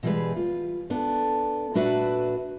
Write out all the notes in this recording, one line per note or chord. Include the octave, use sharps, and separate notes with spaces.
B2 E3 G3 G#3 G#4 B4
F4
B3 D4 A4
A#2 A3 D4 F#4 B4 E5